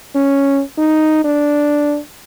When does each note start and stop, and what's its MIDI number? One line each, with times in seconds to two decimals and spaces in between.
0.15 0.61 61
0.78 1.21 63
1.25 1.99 62